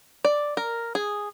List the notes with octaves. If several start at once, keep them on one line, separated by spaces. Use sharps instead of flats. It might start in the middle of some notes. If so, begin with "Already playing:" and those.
D5
A#4
G#4